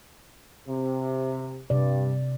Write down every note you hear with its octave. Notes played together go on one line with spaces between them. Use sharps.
C3
G2 C3 D5